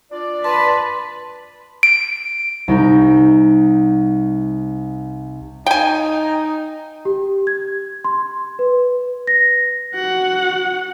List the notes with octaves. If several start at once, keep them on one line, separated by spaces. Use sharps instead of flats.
D4 F4 D5
B4 A5 C6
D7
C2 D#4 G6
D#4 G5 G#5
G4
G#6
C6
B4
A#6
F#4 F#5